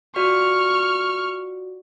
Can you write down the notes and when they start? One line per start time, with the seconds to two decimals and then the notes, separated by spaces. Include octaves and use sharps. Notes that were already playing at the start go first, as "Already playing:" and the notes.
0.16 F4 F#4 D5 C#6 F6